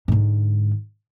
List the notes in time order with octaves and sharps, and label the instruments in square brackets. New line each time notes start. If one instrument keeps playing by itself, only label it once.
[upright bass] G#2 D3